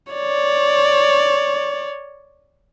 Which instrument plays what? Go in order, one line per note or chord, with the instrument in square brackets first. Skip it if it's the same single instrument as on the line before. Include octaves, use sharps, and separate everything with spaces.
[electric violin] C#5 D5